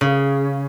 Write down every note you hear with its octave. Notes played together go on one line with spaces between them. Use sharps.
C#3